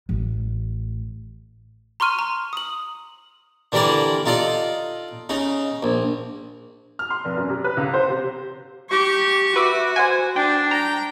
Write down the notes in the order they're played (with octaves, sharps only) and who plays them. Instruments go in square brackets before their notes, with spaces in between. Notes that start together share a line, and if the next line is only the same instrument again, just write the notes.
[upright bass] A1
[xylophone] A#5 C6 C#6 F6 D#7
A#5
D#6 F#7
[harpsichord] D3 E3 G3 A#4 D5
D#4 F4 A4 D5
C#3 D#4
A#1
[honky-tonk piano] F6
C6
F1
F#2
C3
B4
C#2
C5
C3
[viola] G4 C#6
[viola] F#4 [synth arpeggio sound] B4 E5 D6
[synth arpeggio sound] C5 F#5 G#5
[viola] D4 [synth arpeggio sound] G5
[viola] G5 [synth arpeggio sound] A#5